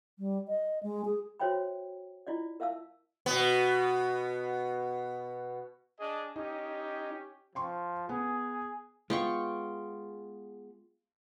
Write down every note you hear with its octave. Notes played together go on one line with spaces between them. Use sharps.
G3
D#5
G#3
G#4
F#4 C5 C#5 E5 G5 B5
E4 F4 D5 D#5
A#4 E5 F5 A5 E6
B2 B3
D4 G#4 D#5
C#4 D#4 G4
F3 G5 C6 C#6
B3 G#4
G#3 B3 F4 G5 C#6